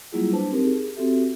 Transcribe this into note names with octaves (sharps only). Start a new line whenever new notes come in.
F#3 G3 A#3 E4 F4 G#4
D4 B4 C5 A5
C4 D#4 G4 A#4
G#4
C4 F#4 G4 A4 E5